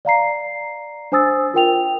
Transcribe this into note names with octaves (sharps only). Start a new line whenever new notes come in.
D5 F5 A#5 C7
D4 C5 G#5 D#6 E6 A6
F4 A#4 G5 F7